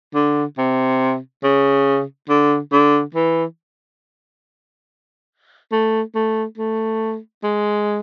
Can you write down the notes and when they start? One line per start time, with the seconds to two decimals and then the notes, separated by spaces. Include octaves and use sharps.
0.14 D3
0.58 C3
1.43 C#3
2.29 D3
2.72 D3
3.14 E3
5.72 A3
6.15 A3
6.58 A3
7.43 G#3